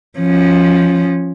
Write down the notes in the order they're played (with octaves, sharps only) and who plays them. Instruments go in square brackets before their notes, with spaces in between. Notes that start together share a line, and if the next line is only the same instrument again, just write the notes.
[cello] F3 C#4